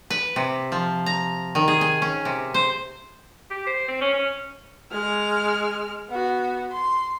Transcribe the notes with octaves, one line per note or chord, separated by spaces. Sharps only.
B4
C3
F3
A#5
D#3
G#4
G#5
C#4
C3
C5
G4
C5
C4
C#4
C#4
G#3 F6
B3 F#4
C6